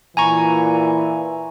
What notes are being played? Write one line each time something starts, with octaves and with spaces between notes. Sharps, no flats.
A#2 E3 G#5 A#5 C#6